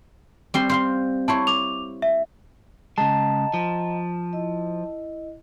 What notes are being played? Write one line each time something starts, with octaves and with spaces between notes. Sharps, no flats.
G3 C4 C6
C5 F5 C6
E4 C5 C#5 A5
D6 F7
E5
C#3 G#3 D#5 G5 A5 A#5
F3
E4 D#5